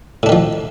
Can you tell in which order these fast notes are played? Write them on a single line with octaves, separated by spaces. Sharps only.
A2 D4 D#3 F3